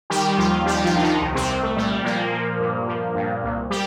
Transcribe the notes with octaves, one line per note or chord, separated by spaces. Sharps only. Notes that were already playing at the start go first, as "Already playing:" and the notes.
D#3 G3 G4
D#2 F3 F4
D#3 G3 G4
F3 F4
D#2 D4
D#3 D#4
C2
C3 C4
C2
A3
A#2 G3
A#2 F3 A#3
F3
G2
F3
G2
C2
G3 G4